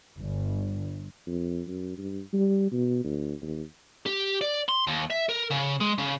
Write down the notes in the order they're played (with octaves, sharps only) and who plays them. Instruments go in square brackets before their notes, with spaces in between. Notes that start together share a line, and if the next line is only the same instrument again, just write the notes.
[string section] G1
[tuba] F2
F#2
G2
G3
B2
D2
D#2
[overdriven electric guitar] G4
D5
C6
D#2
E5
A#4
C#3
G#3
C#3